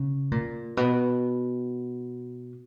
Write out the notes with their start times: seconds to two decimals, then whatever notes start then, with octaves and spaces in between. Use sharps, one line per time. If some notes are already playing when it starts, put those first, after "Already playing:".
Already playing: C#3
0.31 A#2
0.77 B2